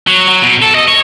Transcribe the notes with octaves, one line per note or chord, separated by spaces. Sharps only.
F#3
F#3
B2
A4
D#5
C#5